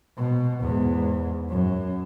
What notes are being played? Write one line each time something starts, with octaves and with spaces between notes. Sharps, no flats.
B2
E2 G#2
F#2